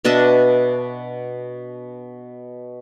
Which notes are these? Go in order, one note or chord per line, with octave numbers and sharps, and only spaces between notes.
B2 D4 D#5 E5